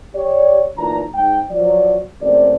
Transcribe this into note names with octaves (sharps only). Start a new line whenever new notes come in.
G4 C#5 D5
B1 A#2 E3 D4 A#5
G#2 G5
F3 F#3 D5
F#1 F#2 F#3 A3 C4 D5